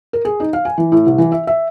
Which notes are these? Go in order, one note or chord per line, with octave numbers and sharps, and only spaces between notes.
A#4
G#4
D#4
F5
G#5
E3
A2
C2
E3
E5
E5